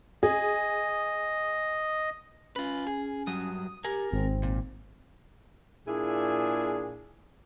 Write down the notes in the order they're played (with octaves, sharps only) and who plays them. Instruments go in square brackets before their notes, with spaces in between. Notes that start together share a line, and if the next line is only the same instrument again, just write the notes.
[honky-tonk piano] G#4 [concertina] D#5
[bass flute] C#4 [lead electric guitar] F4 B4
[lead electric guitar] G#4
[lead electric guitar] G2 F#3 [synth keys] D#6
[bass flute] G4 [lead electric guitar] A#4 G#5
[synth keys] G#1 [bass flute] C4
[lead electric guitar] A#2
[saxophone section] A#2 D4 E4 G#4